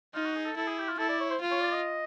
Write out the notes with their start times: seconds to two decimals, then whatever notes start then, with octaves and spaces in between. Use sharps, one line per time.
0.14 D#4 F4
0.25 F#4
0.36 G#4
0.46 A4
0.57 E4 A4
0.67 G#4
0.78 G4
0.89 F4
0.98 E4 A4
1.09 D5
1.20 C#5
1.30 C5
1.41 F4
1.51 C#5
1.62 D5
1.72 D#5